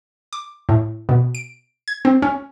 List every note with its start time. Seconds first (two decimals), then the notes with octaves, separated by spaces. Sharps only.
0.33 D6
0.69 A2
1.09 B2
1.35 D7
1.88 G#6
2.05 C4
2.22 C#4